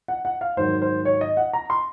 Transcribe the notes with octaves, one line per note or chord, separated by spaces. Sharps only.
F#5
F#5
F5
G#2 D#3 F#3 C5
C5
C#5
D#5
F#5
A#5
C6